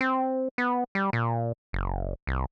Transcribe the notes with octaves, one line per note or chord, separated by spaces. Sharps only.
C4
B3
G3
A#2
F#1
C2